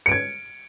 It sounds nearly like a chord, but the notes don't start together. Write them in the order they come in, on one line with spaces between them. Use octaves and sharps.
C#7 D7 G#6